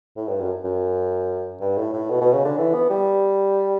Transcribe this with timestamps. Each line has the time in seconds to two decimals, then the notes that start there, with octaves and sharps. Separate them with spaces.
0.17 A2
0.28 G2
0.40 F#2
0.64 F#2
1.61 G2
1.77 A2
1.93 A2
2.10 B2
2.21 B2
2.33 C#3
2.45 D3
2.58 E3
2.74 B3
2.90 G3